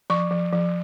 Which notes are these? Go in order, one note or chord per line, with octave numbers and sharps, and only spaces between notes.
F3 C#6
F3
F3